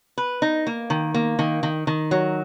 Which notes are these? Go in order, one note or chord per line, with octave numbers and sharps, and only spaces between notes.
B4
D#4
A#3
D#3
A#3
D#3
D#3
D#3
F#3